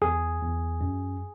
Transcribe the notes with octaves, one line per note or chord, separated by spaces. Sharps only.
E2 G#4
E2
F#2